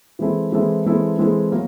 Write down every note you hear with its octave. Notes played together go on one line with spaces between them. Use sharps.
E3 G#3 C4 E4 A4
E3 G#3 C4 E4 A4
E3 G#3 C4 E4 A4
E3 G#3 C4 E4 A4
F#3 A#3